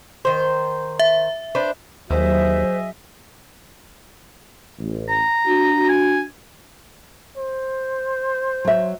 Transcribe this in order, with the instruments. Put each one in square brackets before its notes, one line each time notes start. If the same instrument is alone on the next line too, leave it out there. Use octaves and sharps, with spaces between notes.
[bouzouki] D#3 C5
[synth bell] E5
[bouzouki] D4 B4 C5
[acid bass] D#2 [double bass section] F#3 [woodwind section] G#4 D#5 E5 [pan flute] C5
[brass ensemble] A1
[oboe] A#5
[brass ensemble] D4 F#4
[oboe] G#5
[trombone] C5
[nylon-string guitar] F#3 E5